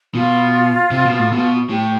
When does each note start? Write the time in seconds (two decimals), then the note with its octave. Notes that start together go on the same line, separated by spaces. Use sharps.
0.15 B2 F4
0.91 C3
1.05 B2
1.19 A2
1.32 B2
1.69 A2 G4